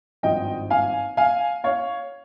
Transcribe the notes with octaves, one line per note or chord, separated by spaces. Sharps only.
G#1 G2 F3 D#5 G5
F5 G#5
F5 G#5
C#5 F5